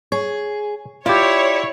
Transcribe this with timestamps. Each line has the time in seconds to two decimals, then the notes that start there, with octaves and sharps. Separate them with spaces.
0.12 G#4 C#5
1.06 E4 F4 G4 C#5 D5